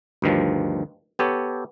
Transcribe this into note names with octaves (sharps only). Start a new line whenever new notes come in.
D2 G2 D#3 F3
B3 G4 A4 C#5